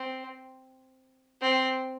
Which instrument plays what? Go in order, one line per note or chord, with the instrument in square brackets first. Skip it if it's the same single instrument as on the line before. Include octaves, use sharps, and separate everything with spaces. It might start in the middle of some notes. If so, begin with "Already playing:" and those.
Already playing: [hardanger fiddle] C4
C4